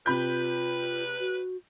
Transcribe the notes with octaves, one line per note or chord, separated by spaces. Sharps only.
C3 F4 B4 B5 G6
F#4